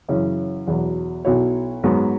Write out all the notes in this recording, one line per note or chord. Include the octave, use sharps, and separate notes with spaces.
F#2 C#3 E3 C#4
E2 B2 F#3
B1 B2 F#3 E4 C#5
G#2 F#3 B3 F#4